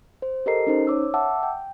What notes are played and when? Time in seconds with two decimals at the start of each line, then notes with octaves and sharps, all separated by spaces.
0.22 C5
0.46 G4 A4 A#4 D#5 A#5 C7
0.67 C#4 D#4 C5
0.87 C#5 D6 E6
1.14 E5 F#5 A5 D6 E6
1.43 G5